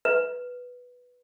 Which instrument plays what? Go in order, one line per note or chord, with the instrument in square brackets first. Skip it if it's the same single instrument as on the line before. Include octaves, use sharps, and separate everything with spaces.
[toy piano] B4